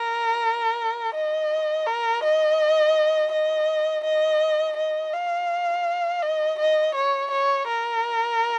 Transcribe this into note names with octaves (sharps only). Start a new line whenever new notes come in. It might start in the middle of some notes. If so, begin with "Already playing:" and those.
Already playing: A#4
D#5
A#4
D#5
D#5
D#5
D#5
F5
D#5
D#5
C#5
C#5
A#4